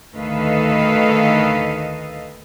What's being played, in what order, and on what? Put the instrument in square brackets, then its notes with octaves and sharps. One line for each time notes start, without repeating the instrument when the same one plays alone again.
[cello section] D2 D#3 A4 B4 D#5 F5